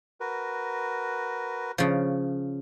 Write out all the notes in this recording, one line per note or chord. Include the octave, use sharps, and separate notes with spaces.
F#4 A#4 B4
C#3 F3